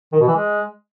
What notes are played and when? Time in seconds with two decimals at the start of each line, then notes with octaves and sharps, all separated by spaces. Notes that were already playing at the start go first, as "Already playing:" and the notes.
0.12 D#3
0.20 B2
0.28 E3
0.35 G#3